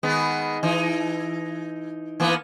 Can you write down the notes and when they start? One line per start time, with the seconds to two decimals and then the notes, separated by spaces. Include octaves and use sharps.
0.03 D#3 G#3 B3
0.63 E3 D#4
2.20 E3 A#3 B3